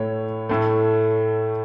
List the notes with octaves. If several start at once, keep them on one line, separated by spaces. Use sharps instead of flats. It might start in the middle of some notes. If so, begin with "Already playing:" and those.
Already playing: A2 A3 C#5
A2 A3